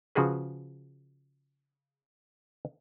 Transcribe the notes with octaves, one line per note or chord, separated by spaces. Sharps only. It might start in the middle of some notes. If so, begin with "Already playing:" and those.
C#3 F3 F#4 G#4 B4